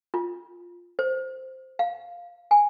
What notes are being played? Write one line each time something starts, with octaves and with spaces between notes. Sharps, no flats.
F4
C5
F5
G#5